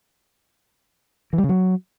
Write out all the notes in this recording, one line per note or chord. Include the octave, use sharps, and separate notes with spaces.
E3
G3
C#3
F#3